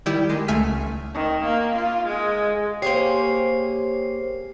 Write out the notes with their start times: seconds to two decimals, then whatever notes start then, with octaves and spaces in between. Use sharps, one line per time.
0.06 D#3 G3 E4 G4
0.29 D#3 G#3
0.48 C#2 A3 E5 G#5 F6 B6
1.14 D#3
1.45 A#3
1.76 F4
2.07 G#3
2.82 A#3 G4 G#4 C5 C#5 C7